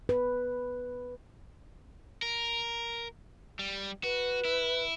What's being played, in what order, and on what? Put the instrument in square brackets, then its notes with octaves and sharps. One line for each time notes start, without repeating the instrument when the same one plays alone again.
[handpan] B4
[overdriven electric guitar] A#4
G3
[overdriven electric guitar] F#4 [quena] B4
[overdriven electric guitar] E4